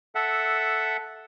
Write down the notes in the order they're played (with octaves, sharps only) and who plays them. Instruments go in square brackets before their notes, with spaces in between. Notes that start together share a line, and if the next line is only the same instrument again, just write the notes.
[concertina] A4 E5 F#5